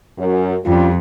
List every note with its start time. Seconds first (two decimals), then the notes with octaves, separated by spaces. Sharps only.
0.18 F#2
0.65 F2 G3 C#4 F4